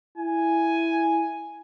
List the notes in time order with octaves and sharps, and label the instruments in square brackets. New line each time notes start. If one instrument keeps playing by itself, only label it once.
[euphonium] E4 [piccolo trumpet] G#5